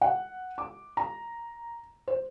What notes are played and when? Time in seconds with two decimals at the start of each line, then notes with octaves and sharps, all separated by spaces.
0.01 F#5
0.58 D6
0.97 A#5
2.08 C5